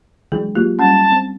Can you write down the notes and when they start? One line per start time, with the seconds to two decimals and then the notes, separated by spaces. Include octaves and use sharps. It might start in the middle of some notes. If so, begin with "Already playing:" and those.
0.32 E3 F#3 G#3 D4 G#4
0.55 F#3 A#3 F4 G4
0.79 G3 C#4 A5
1.12 C4